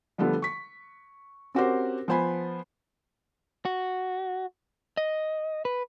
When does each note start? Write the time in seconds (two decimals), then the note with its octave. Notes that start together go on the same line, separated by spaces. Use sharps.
0.18 D3 F3 G3 A3 B3
0.42 C#6 B6
1.55 C4 C#4 F#4 G4 A#4 C5
2.08 F3 B3 C5 G#5 B5
3.65 F#4
4.97 D#5
5.65 B4